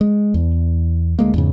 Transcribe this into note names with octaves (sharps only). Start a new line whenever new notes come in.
G#3
E2
D2 G#3 A#3
E2 G#2 C#3